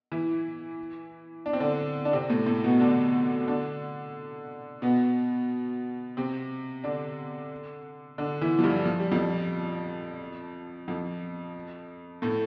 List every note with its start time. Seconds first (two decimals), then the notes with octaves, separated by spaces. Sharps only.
0.12 E3 E4
1.46 D4
1.53 C4
1.60 D3 D4
2.05 D4
2.13 C3 C4
2.30 A2 A3
2.46 A2 A3
2.64 B2 B3
2.80 D3 D4
3.47 D3 D4
4.82 B2 B3
6.17 C3 C4
6.84 D3 D4
8.18 D3 D4
8.41 E3 E4
8.59 F3
8.63 G2 G3
8.85 F3
8.99 G3
9.11 F2 F3
10.88 F2 F3
12.22 A2 A3